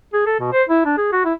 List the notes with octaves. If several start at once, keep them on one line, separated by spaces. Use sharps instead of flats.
G#4
A4
B2
C5
E4
D4
G#4
F#4
E4